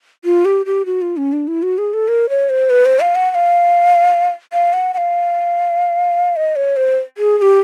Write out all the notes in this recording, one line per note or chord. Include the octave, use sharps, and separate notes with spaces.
F4
G4
G4
F#4
F4
C#4
D4
E4
F#4
G#4
A4
A#4
C#5
C5
B4
C5
F5
F#5
F#5
F5
F5
F#5
F#5
F5
D#5
C#5
C5
G#4
G#4
G4